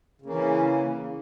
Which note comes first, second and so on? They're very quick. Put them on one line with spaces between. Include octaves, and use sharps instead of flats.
C#3 A#3 E3 C#4